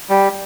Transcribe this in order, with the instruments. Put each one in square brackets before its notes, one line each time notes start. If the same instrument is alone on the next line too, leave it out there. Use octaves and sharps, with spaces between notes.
[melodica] G3